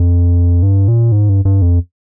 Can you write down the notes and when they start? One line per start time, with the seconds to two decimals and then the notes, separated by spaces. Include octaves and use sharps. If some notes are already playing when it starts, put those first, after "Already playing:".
Already playing: F2
0.63 G2
0.88 A#2
1.12 G#2
1.29 G2
1.45 G2
1.62 F2